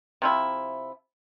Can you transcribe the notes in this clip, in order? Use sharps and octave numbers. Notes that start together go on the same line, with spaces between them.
C3 F3 E4